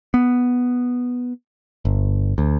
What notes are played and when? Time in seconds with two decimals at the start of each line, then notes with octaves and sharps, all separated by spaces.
0.14 B3
1.85 G1
2.38 D2